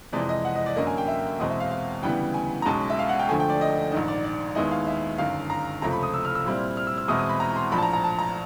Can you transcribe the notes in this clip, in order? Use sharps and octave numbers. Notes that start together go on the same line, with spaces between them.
F2 C3 E3 G#3 D5
D#5
F#5
D#5
D5
F#2 D3 F#3 A#3 D#5
G#5
G5
E5
E2 B2 G#3 C4 D#5
E5
F5
F5
D2 C#3 E3 G3 B3 G5
G#5
A#5
B1 B2 G#3 C#4 A5
E5
F5
F#5
G5
D2 D3 F3 A3 G#5
G5
D5
D#5
A#1 G#2 D#3 D#5
D5
D5
D#2 D#3 G#3 B3 E4 D#5
F5
E5
G1 F#2 D#3 F5
A#5
C#2 C3 F3 A3 A#5
B5
D#6
E6
F6
E6
A#2 G3 C4 E4
F6
E6
E6
E2 B2 G#3 C4 E4 D#6
D#6
B5
A#5
C6
A#1 A2 F3 B5
A5
A#5
A#5
A5
A#5